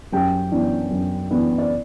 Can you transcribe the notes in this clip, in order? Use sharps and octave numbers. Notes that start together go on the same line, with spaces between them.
F#2 G4 G5
E3 B3 D4
F#2
E3 B3 D4
D5